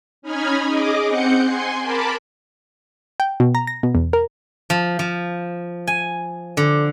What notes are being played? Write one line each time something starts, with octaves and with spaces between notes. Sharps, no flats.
C#4 D#4 D#5 B5 F6 G#6
G#4 D#5 D6
C4 F#5 G6 C#7
G#5 C6
A#4 A5 B5 D6
G5
B2
A#5
A#6
B2
E2
A#4
F3
F3
G#5
D3